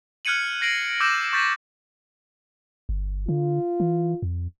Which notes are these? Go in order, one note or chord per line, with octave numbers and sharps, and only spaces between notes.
F6 F#6 G#6 C#7 D#7 F#7
F#6 A#6 C7 D7 F#7
D6 E6 G6 A#6 E7 F#7
C#6 G6 A6 B6
G1
D3 F4
E3
F2